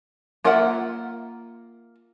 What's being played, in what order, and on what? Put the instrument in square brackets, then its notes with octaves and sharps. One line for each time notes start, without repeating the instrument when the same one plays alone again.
[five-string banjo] A#3 F4 A#4 E5 F#5